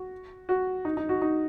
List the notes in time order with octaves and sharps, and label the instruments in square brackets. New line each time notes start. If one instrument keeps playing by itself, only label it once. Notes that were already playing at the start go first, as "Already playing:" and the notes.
Already playing: [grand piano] F#4
F#4
D#4
D#4
F#4
D#4